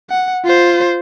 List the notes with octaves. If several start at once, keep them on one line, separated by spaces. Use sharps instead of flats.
F#5
F4 C5